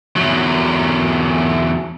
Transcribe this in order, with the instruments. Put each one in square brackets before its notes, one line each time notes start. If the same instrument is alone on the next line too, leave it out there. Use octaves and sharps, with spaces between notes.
[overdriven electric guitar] E2 F#3